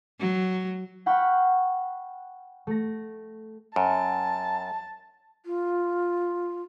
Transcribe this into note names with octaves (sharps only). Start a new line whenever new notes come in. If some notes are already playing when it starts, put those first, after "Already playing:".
F#3
F#5 G5 B5 C#6 F6
A3 A#6
F#2 A5
F4